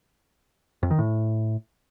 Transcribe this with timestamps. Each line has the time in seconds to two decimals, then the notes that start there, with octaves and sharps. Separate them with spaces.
0.83 F2
0.91 D#3
0.99 A2